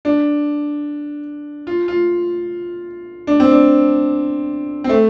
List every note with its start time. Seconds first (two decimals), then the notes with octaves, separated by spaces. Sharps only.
0.05 D4
1.67 F4
1.88 F4
3.27 D4
3.40 C4
3.51 D4
4.84 C4
4.89 A3